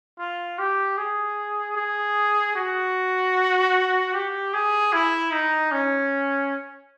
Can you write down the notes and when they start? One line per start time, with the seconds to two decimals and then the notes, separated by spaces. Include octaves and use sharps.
0.19 F4
0.59 G4
0.98 G#4
1.77 G#4
2.56 F#4
4.14 G4
4.54 G#4
4.93 E4
5.32 D#4
5.72 C#4